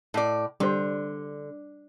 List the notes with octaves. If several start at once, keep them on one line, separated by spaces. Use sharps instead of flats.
A2 D5
D3 G3 C5